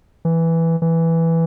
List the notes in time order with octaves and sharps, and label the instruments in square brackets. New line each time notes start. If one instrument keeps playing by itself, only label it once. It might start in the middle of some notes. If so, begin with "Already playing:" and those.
[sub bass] E3
E3